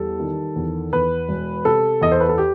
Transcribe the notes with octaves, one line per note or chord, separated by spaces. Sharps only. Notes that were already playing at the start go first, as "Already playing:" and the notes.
Already playing: E2 G3 A4
D#3
E2
E2 B4
E1
C3 A4
E2 D#5
C5
B4
A4
G4